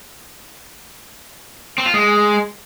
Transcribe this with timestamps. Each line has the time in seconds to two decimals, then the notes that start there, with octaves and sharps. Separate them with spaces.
1.78 C4
1.86 F4
1.94 G#3